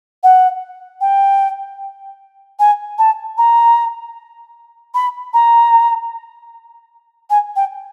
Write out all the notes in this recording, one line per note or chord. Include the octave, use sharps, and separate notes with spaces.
F#5
G5
G#5
A5
A#5
B5
A#5
G#5
G5